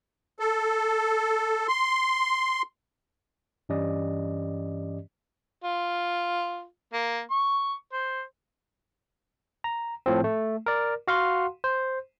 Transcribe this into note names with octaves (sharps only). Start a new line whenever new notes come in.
A4
C6
G2 E3 C#4 G4 D5 D#5
F4
A#3
C#6
C5
A#5
A2 F3 C4
A3
A#4 D5
F#4 F5 F#5 C6
C5